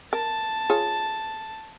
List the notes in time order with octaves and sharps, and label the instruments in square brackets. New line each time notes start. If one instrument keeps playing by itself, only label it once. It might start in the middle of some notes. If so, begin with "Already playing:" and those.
[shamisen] A#4 [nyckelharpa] A5
[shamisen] F4 G#4 C#5